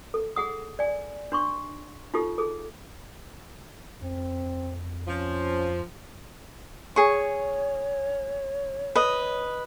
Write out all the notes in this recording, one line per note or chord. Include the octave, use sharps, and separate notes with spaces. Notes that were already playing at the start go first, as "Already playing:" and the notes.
A4
G#4 F#5 D#6
D5 G#5
D4 C6 C#6
D#4 F4 G4 A4
G#4 A4
F2 C4
F3 C#4
G#4 C#5 C#6
B4 D#5